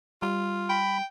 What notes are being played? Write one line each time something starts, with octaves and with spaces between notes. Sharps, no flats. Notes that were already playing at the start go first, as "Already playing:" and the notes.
G3 F4
G5 B5